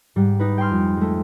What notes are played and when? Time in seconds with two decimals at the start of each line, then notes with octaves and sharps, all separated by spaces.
0.16 G#2 G3
0.39 D#4 B4
0.58 G5 G#5 C6 F6
0.71 F2
0.97 G#3 A3